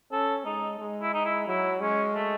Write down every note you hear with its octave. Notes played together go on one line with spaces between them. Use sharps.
C#4 A4
G#3 D#4
G#3
E4
D#4
E4
F#3 E4
G#3 C#4
A3